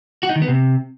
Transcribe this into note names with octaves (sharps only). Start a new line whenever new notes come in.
F#4
D#4
D#3
B3
C3